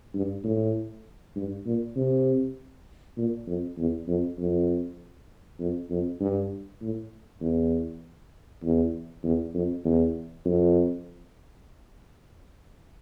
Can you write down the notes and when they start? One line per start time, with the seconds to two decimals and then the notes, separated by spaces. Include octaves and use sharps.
0.14 G2
0.44 A2
1.36 G2
1.66 A#2
1.96 C3
3.17 A#2
3.47 F2
3.78 E2
4.07 F2
4.38 F2
5.59 F2
5.90 F2
6.20 G2
6.81 A2
7.41 E2
8.63 E2
9.24 E2
9.54 F2
9.84 E2
10.45 F2